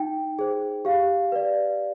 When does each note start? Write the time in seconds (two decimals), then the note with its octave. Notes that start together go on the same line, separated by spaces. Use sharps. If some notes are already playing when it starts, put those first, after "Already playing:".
Already playing: D#4 G5
0.39 G#4 C5
0.85 G4 F5
1.32 B4 D5